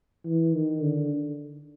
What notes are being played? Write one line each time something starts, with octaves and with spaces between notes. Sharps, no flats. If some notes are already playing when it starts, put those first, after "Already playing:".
E3
D#3
D3